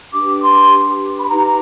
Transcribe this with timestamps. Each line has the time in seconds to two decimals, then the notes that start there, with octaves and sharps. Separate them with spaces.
0.13 D4 G4 B4 D6
0.42 C6
1.19 B5
1.29 D#4 G4 B4 A#5